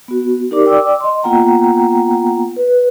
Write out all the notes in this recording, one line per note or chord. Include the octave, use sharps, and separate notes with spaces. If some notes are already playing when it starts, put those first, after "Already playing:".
B3 F#4
D#4 G4 A#4 D5 D6
D5 G5 D6 E6
D#5 C6
A#3 B3 F4 F#5 G5 A#5
B4